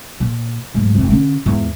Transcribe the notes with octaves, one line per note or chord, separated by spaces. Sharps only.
A#2
D1 G#2
F1 C4
D3 C#4
E2 G#2